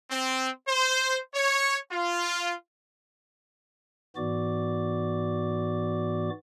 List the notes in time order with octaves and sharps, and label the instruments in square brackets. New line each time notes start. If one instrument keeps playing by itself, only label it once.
[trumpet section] C4
C5
C#5
F4
[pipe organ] G#2 E3 B3 F#4 D5 D6